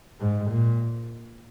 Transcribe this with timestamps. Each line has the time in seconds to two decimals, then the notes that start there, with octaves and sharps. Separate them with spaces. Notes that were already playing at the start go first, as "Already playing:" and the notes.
0.21 G#2
0.51 A#2